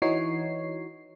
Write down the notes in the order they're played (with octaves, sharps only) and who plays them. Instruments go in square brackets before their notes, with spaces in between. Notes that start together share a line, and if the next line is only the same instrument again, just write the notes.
[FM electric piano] E3 D#4 F#4 C#5 C7